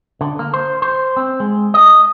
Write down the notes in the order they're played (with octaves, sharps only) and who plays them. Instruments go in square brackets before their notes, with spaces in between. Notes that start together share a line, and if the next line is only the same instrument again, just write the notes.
[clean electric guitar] D3
A#3
C5
C5
C4
G#3
D#5